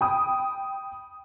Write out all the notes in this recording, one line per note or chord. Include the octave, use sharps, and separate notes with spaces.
G5 B5 D#6